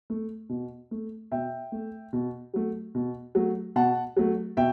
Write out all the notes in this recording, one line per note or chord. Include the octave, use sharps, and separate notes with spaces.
A3
B2
A3
B2 E5 G5
A3
B2
F#3 A3
B2
F#3 A3
B2 F#5 A5
F#3 A3
B2 E5 G5